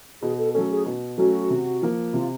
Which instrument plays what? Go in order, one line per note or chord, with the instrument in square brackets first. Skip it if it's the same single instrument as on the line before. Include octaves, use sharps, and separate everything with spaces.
[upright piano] B2 [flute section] G#4
[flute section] A4
[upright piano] F#3 A3 C#4 [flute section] A4
[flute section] G#4
[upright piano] B2
[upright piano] F#3 A3 C#4 [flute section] F#4
[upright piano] C3
F3 A#3
[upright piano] C3 [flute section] F4